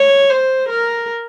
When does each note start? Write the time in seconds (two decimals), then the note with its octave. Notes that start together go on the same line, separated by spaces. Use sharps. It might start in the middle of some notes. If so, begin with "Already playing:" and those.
Already playing: C#5
0.30 C5
0.69 A#4